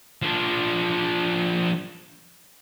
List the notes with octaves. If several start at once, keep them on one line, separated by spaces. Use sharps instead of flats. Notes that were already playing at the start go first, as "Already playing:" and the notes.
F3 D4